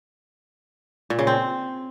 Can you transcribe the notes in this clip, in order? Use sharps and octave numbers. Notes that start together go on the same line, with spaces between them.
A#2
C#3
C4